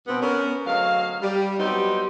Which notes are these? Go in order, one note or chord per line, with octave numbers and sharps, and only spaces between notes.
G2 B2 B3 C4
B3 C#4 A#4
D2 F#3 G#3 F5
G3
F#3 G3 B3 C4 D#4 G4